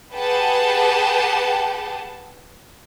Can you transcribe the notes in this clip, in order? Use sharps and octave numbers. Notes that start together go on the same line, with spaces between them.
G4 G#4 B4 F#5 G5 A5